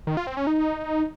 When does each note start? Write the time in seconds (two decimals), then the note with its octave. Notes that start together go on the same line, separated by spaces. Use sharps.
0.07 D#3
0.17 F4
0.27 C4
0.37 C#4
0.47 D#4